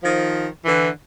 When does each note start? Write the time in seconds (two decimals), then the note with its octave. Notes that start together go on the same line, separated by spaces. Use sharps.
0.01 D#3 F3
0.65 D3 E3